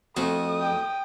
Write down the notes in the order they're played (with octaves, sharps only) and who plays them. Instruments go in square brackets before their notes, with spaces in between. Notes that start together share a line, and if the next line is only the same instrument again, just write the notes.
[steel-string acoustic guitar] F2 [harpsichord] A3 E4 F#4 [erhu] D#6
[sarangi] G5